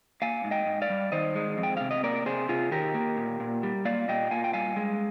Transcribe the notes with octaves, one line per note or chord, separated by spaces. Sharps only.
A#3 F5 G#5
G#2
D#5 G5
G#2
D5 F5
G3
D#3 C5 D#5
G#3
F2
G5
C3 F5
D#5
A#3 A#4 D5
C3 G#4 C5
C3 F4 G#4
D#3 G4 A#4
A#3
A#2
A#2
G3
A#3 D5 F5
A#2 D#5 G5
A#2 F5 G#5
G5
G3 F5 G#5
G#3